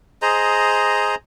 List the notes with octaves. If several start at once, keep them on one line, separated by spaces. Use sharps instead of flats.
G#4 C5 D#5 A#5